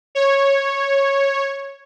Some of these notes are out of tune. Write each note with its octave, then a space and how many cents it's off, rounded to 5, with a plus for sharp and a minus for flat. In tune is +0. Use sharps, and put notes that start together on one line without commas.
C#5 -10